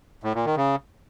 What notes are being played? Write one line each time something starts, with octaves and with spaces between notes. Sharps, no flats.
A2
A#2
D#3
C#3